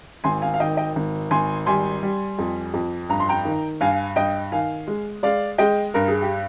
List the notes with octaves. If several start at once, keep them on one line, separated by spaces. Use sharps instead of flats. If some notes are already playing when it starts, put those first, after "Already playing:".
G#1 G#5 C6
F5 G#5
F5
D#3 D#5 G5
D#5 G5
G#1
G#1 G#5 C6
G3 G#5 C6
G3
F2
F2
G2 A#5
C6
G5 A#5
D#3
G2 F5 G#5
G2 D#5 G5
D#3 F5 G#5
G#3
G#3 D5 F5
G#3 D#5 G5
G2 A#4
G#4
G4